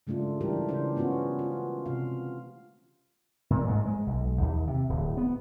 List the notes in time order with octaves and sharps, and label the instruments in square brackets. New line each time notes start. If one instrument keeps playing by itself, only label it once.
[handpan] C#3 G#3 A3 D4 F4
E3 G3 D4 E4 G4 A#4
C#3 C#4 D4 C5
A#3 B3 C#4 F4 F#4
F4
C3 F4 F5
[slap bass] A#2
G#2
G#3
B1
D#2
C3
D1
B3